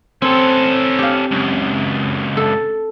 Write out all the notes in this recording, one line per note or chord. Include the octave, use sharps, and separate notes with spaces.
C4 C#4 A4
G4 F5
C#2 F#2
A4